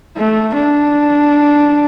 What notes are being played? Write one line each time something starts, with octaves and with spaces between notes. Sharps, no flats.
A3
D4